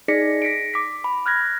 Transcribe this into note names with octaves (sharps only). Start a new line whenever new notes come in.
D#4 G#4 D5 A#6 B6 C#7
A#6 B6 C#7 D7
D6 B6
B5
F6 F#6 G#6 A#6